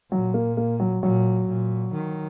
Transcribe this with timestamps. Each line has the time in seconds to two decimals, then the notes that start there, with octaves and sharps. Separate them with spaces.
0.11 A#2 F#3
0.34 A#3
0.57 A#3
0.80 F#3
1.02 A#2 F#3
1.48 A#2
1.93 D#3